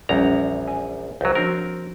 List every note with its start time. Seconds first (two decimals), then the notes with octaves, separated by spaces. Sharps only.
0.09 A#1 E2 G3 C#4 F#5 A#5
0.67 G#5
1.21 C#2 F#3 C5
1.35 F3 C4 D4 F#4 A#4